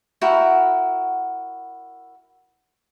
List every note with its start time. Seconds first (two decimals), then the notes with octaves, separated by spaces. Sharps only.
0.21 E4 F#4 A#4 G5